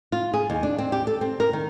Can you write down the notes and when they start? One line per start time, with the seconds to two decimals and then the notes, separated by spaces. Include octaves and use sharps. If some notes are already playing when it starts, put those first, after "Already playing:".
0.12 F4
0.34 G#4
0.50 D#2
0.63 D4
0.78 C4
0.92 G4
1.07 A4
1.21 C4
1.40 A#4
1.53 D#3